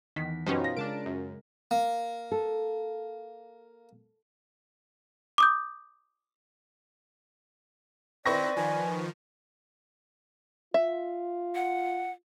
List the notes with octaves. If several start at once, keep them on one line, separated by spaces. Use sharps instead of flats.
E2 D#3 B6
F#2 B2 B3 C#4 D#4 G4 C5
F4 A#6
C#3 G#3 D4 A#4 A5 D7
F#2
A#3
A4
D6 D#6 G6
D#3 C4 E4 B4 D5 C#6 A#6
D#3 F3 G#5
F4 E5
F#5